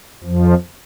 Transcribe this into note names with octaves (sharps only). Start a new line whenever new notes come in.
F2 F3